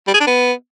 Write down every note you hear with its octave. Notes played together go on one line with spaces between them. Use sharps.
G3
G#4
D4
B3